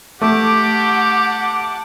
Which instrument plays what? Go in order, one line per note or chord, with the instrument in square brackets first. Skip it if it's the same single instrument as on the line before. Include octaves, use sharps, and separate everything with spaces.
[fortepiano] A3 [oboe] G4 [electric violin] F#5 A5 [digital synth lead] D6